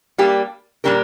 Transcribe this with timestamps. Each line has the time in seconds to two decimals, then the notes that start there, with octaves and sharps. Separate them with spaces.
0.18 G3 A#3 D4 G4
0.84 A#2 G3 D4 G4 A#4